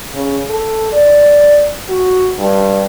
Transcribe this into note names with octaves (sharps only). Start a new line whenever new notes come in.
C#3
A4
D5
F#4
G2